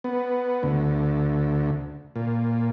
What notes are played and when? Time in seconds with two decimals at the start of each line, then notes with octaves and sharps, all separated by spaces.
0.04 B3
0.63 D2
2.16 A#2